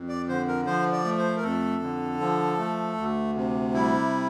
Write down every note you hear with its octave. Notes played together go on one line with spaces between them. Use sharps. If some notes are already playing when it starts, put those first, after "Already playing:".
Already playing: F2
D5
D3 C5
A#4
F3 C5
D5
A3
C5
A#4
F2 A4
D3
F3
A3
D2
C3
G3 E4